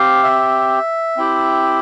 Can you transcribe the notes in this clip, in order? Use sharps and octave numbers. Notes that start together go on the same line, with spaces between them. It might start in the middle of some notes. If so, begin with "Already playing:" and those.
Already playing: C4 G4 F5
E5
C4 E4 G4